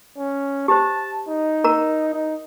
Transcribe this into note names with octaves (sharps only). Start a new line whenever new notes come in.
C#4
G4 C5 A5
D#4
A#4 A#5
D#4